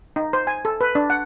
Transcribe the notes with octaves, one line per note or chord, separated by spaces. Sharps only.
D#4
C5
G#5
A4
B4
D4
F#5